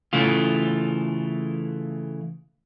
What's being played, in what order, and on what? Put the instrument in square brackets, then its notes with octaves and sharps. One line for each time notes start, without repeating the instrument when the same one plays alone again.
[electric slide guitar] C#3 E3 A3 F4